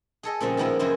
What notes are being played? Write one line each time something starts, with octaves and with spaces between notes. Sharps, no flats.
G#4 A4 D#5
A#2 C#3 F3 G3 C4 C#4
D#3 F3 A#3 B3 E4
F#2 C#3 F#3 G#3 E4 C5